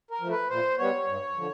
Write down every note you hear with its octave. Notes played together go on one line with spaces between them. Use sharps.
A#4
F3 A3
B4
A#2 C5
G3 B3 C#5
G2
D3 F3